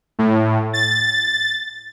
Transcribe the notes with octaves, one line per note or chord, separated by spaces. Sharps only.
A2
A6